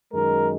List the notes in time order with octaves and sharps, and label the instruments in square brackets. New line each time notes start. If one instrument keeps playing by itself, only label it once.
[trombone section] F#2 D#3 G#3 A#4